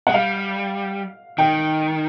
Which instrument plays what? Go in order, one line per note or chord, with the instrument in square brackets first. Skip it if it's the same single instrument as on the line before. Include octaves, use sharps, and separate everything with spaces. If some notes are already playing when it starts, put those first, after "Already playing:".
[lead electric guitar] G#3 [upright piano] F#5
[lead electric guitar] G3 [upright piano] F5
[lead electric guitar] D#3 [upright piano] G5